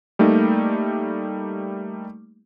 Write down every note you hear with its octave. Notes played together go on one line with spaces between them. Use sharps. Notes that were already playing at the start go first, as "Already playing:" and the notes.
G3 A3 A#3 D#4